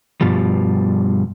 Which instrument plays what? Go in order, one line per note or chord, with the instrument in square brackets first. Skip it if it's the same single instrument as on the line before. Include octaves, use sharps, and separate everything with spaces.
[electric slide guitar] G2 B2 F3 G3